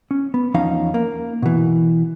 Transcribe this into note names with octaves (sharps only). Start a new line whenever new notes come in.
C#4
B3
E2 F3 C#4 D#4 F5
A#3
B2 E3